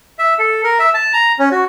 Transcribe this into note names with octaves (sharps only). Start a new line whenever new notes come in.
E5
A4
A#4
E5
A5
A#5
C#4
F#4